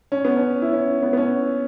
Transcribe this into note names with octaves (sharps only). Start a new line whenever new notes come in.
C#4
B3
C#4
E4
C#4
B3
B3
C#4